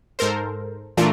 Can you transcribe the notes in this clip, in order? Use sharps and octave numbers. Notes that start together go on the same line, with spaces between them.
G#2 A4 A#4 C5
A#2 E3 A3 D4 F4 A#4